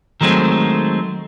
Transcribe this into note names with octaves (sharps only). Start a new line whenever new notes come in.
D#3 F#3 G#3 A3 C4